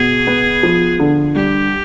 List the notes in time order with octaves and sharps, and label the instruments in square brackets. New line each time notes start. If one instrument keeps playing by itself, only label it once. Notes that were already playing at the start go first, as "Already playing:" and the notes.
Already playing: [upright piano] B2 [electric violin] G#4
[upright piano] B3
F3
D3
[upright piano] G3 [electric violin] G4